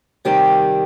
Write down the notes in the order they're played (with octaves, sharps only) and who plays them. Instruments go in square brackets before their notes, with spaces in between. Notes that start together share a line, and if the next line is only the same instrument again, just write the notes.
[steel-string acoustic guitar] C3 D#3 G3 C4 G4